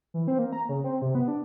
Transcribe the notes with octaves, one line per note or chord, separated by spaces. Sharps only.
E3
C4
A#3
A#5
C#3
C4
C3
B3
D4